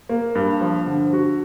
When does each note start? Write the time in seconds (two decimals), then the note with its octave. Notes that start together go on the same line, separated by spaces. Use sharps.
0.09 A#3
0.35 G2
0.61 F3
0.87 D3
1.13 F#4